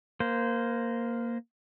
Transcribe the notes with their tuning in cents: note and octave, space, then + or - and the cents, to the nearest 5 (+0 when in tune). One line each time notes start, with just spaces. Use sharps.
A#3 +0 C5 -20